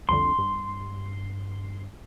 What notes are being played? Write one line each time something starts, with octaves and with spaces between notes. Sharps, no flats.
C2 F2 D3 C6
G2